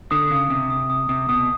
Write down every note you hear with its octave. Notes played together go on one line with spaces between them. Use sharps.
D3 D#6
C#3 D#6
C3 D#6
D#6
D#6
C3 D#6
B2 D#6